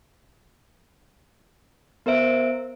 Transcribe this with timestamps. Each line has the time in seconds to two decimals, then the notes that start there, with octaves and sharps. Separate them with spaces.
2.06 B3 A#4 C5 E5 D7